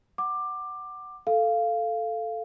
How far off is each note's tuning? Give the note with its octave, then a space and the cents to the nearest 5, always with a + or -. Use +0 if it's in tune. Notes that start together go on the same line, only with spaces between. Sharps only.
F#5 +15 D6 +15
A4 +0 F5 -10